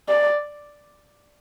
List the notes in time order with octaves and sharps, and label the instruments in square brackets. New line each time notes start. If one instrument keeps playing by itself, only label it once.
[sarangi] D5